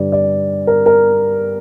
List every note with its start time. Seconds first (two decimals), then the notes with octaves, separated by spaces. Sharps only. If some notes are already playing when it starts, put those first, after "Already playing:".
Already playing: G2 D3 G3 D5
0.12 D5
0.67 A#4
0.86 A#4